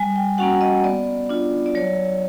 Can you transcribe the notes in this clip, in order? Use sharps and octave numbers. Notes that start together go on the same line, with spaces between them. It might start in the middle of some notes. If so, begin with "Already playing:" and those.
Already playing: G3 G#5
G5
A#3 C#4 F#4 F#5
D#5
B3 D5
D4 F4
D5
F#3 C#5